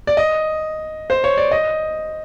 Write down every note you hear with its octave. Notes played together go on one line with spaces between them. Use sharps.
D5
D#5
C5
C#5
D5
D#5